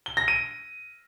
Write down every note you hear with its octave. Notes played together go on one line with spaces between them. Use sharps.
G7
A#6
D#7